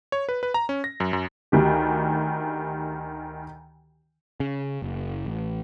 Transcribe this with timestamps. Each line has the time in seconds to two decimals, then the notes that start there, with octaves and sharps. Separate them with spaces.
0.12 C#5
0.29 B4
0.43 B4
0.54 A#5
0.69 C#4
0.84 A#6
1.00 F#2
1.13 F#2
1.52 D2 D#3 G4
4.40 C#3
4.82 F#1
5.26 A1